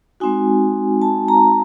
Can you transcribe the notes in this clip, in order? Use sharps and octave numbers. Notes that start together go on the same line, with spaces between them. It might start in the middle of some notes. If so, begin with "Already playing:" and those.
G#3 C4 D#4 F#4 G#5
A5
A#5